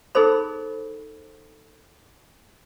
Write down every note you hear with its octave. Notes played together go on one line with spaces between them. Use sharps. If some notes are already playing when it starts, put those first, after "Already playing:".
D#4 G#4 A4 C5 B5